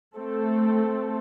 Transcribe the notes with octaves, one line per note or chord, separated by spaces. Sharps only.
A3 C4 A4